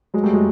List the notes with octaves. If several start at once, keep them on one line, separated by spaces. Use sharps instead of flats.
F#3 G#3
G3 A3
F#3 G#3